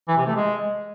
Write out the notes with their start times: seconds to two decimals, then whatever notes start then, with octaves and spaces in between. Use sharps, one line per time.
0.08 E3
0.17 C3
0.26 A3
0.35 G#3